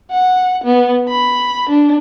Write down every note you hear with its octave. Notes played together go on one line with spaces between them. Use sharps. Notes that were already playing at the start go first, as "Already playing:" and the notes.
F#5
B3
B5
D4